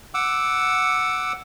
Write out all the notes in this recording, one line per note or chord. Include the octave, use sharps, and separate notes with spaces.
F#5 D6 E6